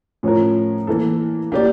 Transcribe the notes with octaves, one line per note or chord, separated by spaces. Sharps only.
A2 F3 C#4 F4 A#4
E3 A#3 E4 A4
A#3 E4 G4 D5